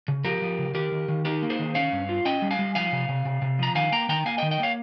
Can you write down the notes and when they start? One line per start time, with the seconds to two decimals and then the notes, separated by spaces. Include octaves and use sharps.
0.08 C#3
0.24 F3 G4 A#4
0.42 F3
0.58 C#3
0.75 D#3 G4 A#4
0.92 D#3
1.08 D#3
1.25 D#4 G4 A#4
1.43 A#3
1.50 G#4 C5
1.59 D#3
1.75 C#4 C#5 F5
1.92 G2
2.09 F4
2.25 C#4 D#5 G5
2.42 G3
2.51 F5 G#5
2.59 G3
2.75 F3 F5 G#5
2.92 C3
3.09 C3
3.25 C3
3.42 C3
3.59 F3 A#5
3.75 D#3 F5 G#5
3.92 A#3 G5 A#5
4.09 D#3 G5 A#5
4.26 A#3 F5 G#5
4.38 D#5 G5
4.42 D#3
4.51 D#5 G5
4.60 A#3 C#5 F5